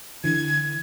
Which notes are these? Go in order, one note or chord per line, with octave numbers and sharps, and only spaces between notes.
D3 E3 G#6